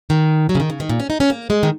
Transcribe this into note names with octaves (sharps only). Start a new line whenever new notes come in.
D#3
F#3
C#3
D#3
C#3
D#3
A#2
C#4
D#4
C#4
A#3
G#3
D#3